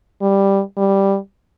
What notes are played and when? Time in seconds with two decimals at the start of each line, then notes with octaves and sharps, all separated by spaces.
0.21 G3
0.77 G3